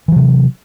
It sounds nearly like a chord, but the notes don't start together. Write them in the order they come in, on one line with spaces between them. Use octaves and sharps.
E3 F#3 C3